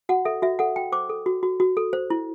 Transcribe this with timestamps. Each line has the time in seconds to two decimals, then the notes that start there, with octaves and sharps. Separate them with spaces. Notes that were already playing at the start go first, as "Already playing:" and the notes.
0.09 F#4 F#5
0.25 A4 E5
0.42 F#4 E5
0.59 A4 F#5
0.76 F#4 G5
0.92 C5 D6
1.10 A4
1.26 F#4
1.43 F#4
1.60 F#4
1.77 A4
1.93 C5
2.10 E4